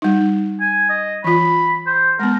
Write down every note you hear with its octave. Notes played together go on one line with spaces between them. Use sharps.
G3 D#4
G#5
D#5
E3 F4 B5
C5
G#3 B3 A#4